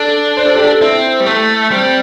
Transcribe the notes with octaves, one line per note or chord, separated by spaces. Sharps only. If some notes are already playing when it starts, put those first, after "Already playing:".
Already playing: D4 A4
C5
A4
G4
A4
C4 E4
G3
A3
G3 C4